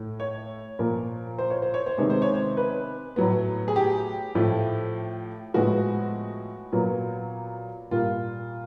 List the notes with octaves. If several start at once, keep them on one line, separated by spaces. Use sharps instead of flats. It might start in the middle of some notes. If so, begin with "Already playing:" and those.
Already playing: A2 A3
C#5
A#2 F3 A#3
C5
C#5
C5
C#5
C5
C3 D#3 G#3 B3 C#5
C5
C#5
C5
B4
A2 F#3 B3
G#4
G4
A2 F3 A3
A2 F3 G#3 B3 F#4
A#2 F#3 B3
A#2 G3 A#3 F4